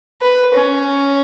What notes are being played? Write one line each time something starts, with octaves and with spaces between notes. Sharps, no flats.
B4
C#4